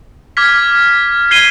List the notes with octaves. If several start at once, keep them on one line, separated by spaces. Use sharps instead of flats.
D6 F6 G#6 B6
G#6 C7 D#7 G7